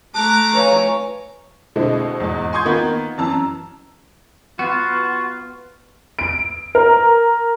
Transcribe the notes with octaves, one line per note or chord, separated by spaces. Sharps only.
A3 F4 A5 A#5 D6 F#6
B4 C#5 F5 G#5
B2 D3 G#3 C4 E4 A4
E2 G#2
G#5 C6 C#6 D#6 G6 G#6
D#3 A#3 B3 F4
F#2 E3 A5 A#5 E6
B3 F4 F#4
D7
A#4